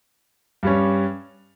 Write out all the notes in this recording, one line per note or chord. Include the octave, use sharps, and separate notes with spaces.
G2 G3 C#4